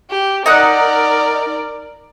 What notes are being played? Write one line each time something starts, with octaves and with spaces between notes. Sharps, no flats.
G4
D#4 A#4 D5 F#5 F#6